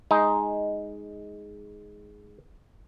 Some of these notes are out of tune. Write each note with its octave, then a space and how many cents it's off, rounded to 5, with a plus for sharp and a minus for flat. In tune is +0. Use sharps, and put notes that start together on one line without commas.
G#3 +0 D#4 +5